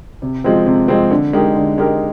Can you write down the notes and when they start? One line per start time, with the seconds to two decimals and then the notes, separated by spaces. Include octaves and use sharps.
0.22 C3
0.44 F3 G#3 C4
0.66 C3
0.88 F3 G#3 C4
1.11 D3
1.33 G#3 D#4 G4 A#4
1.55 D3
1.78 G#3 D#4 G4 A#4